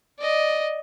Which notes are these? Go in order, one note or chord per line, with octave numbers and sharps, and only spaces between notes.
D5 D#5